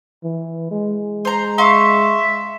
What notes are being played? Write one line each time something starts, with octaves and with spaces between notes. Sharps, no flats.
E3
G#3
C5 A#5
E5 F5 C6 C#6